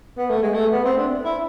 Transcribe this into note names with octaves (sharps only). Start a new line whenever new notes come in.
B3
A3
G#3
A3
B3
C4
D4
E4